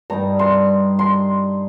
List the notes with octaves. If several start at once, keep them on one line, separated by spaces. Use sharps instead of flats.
G2 G3 D#4 A#5
C6
C6